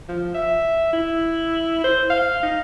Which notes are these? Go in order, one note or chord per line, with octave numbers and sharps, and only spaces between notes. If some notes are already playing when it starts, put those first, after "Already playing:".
F3
E5
E4
C5
F5
D#4